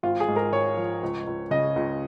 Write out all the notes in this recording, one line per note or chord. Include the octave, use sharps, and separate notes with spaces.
G#1 F4
G#4
G#2
A#4
G#1 C#5
F3
C#2
C#2
C#3 D#5
C#2